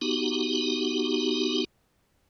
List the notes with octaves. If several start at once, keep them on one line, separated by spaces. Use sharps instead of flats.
B3 D#4 F#4 G4